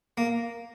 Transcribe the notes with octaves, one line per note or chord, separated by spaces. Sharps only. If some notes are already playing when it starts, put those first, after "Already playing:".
A#3